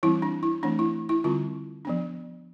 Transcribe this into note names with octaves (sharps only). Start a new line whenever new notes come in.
E3 G3 C4 E4
D4
E4
E3 A3 C4 D4
E4
E4
D3 G3 C4 F4
F3 B3 D4